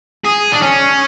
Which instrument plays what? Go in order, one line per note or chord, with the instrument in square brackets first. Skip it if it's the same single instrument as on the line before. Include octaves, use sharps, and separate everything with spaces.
[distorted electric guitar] G#4
D4
C#4